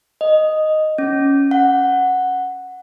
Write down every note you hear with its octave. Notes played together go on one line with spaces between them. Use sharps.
D#5
C#4
F#5